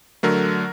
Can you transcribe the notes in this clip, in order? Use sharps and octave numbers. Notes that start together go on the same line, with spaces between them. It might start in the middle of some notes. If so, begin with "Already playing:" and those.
D3 F#3 A3 A#4